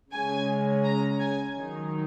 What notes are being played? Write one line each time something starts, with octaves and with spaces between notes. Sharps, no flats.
C#3 G#3 C#4 G#5
A#5
G#5
D#3 F#3 D#4